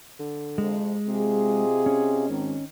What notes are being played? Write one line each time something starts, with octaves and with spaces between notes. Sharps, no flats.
D3
F2 C3 G#3
C3 F4 G#4 D#5
C#4
G#1 D#3